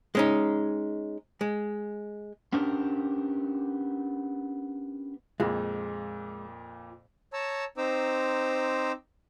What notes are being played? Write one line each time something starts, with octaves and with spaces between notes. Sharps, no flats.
G#3 C#4 D#4
G#3
B3 C#4 D4 G4 A#4 C5
F2 A#2 G#3
C#5 A5 A#5 E6
C4 D#4 C5 A#5 D6 E6